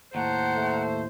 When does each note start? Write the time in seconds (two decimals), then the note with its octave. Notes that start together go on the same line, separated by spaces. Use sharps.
0.15 D#2 A2 C5 F#5 A5 A#5
0.56 A3